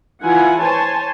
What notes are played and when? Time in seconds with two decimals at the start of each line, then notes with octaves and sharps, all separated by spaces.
0.22 E3 E4 F4 F#5 G#5
0.60 C5 C#5 G#5 A5